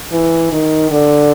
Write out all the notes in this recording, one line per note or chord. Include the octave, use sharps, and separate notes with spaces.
E3
D#3
D3